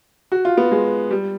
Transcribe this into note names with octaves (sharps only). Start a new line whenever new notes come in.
F#4
F4
B3
G#3
G3